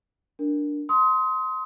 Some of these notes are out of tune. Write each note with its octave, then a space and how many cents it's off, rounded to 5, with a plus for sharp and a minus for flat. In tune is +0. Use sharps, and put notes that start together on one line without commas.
D4 +0 A#4 +0
C6 -5 D#6 +35